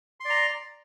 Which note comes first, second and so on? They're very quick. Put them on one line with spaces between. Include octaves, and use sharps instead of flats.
C6 D5 A#5